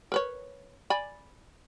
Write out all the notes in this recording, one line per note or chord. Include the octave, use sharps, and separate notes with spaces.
A#4 B4 C#5
D5 G#5 B5